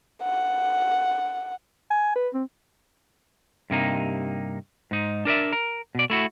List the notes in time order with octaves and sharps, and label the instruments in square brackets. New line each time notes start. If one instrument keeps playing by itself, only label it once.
[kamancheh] F#5
[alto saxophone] G#5
B4
C4
[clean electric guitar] G2 C3 A#3 D#4
G#2 D#4
D4 A#4 D5 E5
A#4
B2 D5
A3 E4 F#4